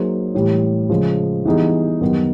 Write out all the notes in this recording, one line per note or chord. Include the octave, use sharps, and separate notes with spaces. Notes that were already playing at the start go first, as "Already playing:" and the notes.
Already playing: F#3 A#3 D#4 G#4 C5
A2 E3 G3
C#3 F3 G#3
E3 G3 B3 D#4 G#4
F#2 D#3 G3 B3 D#4